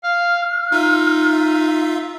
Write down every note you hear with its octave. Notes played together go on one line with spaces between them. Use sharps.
F5 F6
D#4 F4 E5